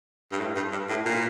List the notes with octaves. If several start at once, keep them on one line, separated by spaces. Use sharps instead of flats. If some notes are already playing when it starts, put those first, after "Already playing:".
G2
A2
G2
G2
A2
A#2